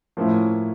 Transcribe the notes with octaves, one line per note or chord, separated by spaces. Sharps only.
A2 F3 A#3 C#4 E4